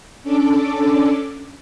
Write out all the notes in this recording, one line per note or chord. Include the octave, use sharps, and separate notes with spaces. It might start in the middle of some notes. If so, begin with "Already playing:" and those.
C#4 D4 A4 D6